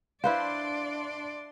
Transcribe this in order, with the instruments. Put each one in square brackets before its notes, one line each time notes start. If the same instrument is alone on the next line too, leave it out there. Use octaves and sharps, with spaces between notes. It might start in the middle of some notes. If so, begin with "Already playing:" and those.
[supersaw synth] D4 C6 [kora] E4 B4 C5 [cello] D5 [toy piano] F5